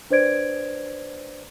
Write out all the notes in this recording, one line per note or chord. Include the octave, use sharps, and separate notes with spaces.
D4 B4 C5 D5 G#6 D7